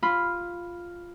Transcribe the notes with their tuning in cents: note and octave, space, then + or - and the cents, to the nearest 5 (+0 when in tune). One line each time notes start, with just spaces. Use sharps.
F4 +0 B5 +0